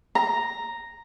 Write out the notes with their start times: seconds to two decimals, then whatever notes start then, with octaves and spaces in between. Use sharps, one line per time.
0.15 A#5